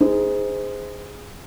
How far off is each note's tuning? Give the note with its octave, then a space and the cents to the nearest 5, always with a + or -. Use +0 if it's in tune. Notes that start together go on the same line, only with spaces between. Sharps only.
D#4 +25 G#4 -10 C5 -25